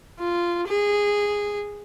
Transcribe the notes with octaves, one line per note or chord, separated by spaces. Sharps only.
F4
G#4